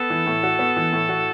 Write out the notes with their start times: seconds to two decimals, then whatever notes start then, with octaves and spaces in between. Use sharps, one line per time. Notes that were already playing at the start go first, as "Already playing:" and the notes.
Already playing: B3 A4
0.10 E3
0.26 A2
0.43 F#4
0.59 B3
0.77 E3
0.93 A2
1.09 F#4